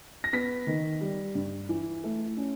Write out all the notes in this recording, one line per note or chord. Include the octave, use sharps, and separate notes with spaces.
A#6
B3 B6
D#3
G3
G2
E3
A3
C#4